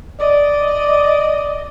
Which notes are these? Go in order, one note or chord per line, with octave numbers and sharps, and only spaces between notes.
D5 D#5